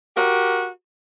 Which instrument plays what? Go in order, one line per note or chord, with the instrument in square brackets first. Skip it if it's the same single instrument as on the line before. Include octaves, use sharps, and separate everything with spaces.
[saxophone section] F#4 G4 A#4